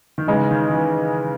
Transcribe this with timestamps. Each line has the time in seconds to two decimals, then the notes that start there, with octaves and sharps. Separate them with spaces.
0.18 D#3
0.27 C#3 E3 G#3 D#4
0.51 D#3
0.69 D#3
0.74 E3